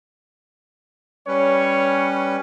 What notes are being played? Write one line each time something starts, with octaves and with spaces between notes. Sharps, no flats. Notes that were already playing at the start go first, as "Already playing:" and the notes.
G3 C#4 B4 C#5